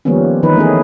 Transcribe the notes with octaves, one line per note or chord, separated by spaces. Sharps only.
D#3 F3 G3 A#3 B3 C#4
D#3 E3 D#4 B4
A3 B3 C#4 G#4